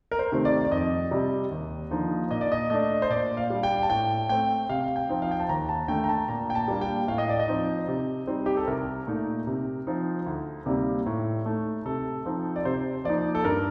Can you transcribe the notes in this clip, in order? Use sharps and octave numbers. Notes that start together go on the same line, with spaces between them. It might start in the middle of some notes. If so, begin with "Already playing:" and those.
A#4
C5
C3 D#3 A3 C4
D5
D5
F2 D#5
C3 G3
D#2
D3 F3 A#3 D#4
A#2 D#5
D5
D#5
A3 D4 D#5
C5
A#2 D5
F5
G3 D4
G5
A5
A2 G5
A3 C4 G5
C3 F5
F5
G5
F3 C4 D#4
F5
G5
A5
D#2 A#5
A5
D3 A3 G5
A#5
A5
A#2 A#5
G5
A5
G3 A#3 D4
G5
A2 F5
D#5
D5
D#5
F3 C4 D#4
C3
G3 C4 D#4
G4
A4
C2 A#4
A#2 A3 D#4
C3
F3 C4 D#4
D2
C3 G3 A#3 D#4
A2
A3 D#4
C3 A4
F3 C4 D#4
D5
C3 C5
F3 A#3 D#4 D5
A4
G2 A#4